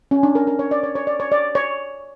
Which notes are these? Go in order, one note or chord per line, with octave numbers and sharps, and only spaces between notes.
C#4
D4
A#4
A#4
C#5
D5
C#5
C#5
D5
C#5
D5
C#5